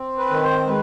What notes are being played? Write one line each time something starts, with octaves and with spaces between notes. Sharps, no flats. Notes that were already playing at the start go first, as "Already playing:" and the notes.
Already playing: C4
B4
D#3
C5
G#3 B4